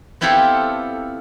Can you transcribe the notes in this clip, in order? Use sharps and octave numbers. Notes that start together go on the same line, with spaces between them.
B3 C4 E4 F4 G4 A4